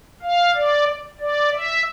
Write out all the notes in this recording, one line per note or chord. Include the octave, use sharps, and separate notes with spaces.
F5
D5
D5
E5